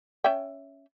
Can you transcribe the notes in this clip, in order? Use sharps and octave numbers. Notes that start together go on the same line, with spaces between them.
C#4 E5 G5